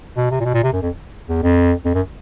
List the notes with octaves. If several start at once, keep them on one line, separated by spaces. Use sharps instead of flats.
B2
C3
A#2
B2
A#2
C3
F#2
F2
E2
F2
F2
F#2